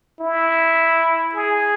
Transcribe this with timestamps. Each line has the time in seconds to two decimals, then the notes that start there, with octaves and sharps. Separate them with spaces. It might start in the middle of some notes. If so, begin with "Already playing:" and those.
0.20 E4
1.35 G#4